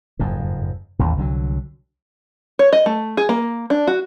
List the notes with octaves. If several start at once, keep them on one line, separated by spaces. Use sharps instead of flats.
F#1 F2 G#2
A1 D#2 A2
C2 D3 E3 F#3
C#5
D#5
A3
G#4
A#3
D4
F#4